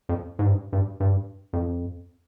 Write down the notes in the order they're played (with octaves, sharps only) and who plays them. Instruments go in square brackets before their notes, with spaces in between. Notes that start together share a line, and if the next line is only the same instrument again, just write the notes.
[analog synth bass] F2
G#2
G2
G2
G2
F2